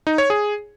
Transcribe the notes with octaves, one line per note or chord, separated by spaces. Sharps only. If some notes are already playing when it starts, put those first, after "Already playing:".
D#4
C#5
G#4